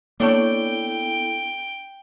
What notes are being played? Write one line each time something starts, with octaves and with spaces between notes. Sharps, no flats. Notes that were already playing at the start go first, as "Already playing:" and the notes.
A#3 B3 D4 E4 A4 C#5 D5 G5